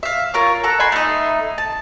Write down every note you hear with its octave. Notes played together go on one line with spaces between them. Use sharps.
E5 F5
F4 A#4 C#5
A4 F#5 A#5
F#5 G#5 B5 C6
A3 D#4
A5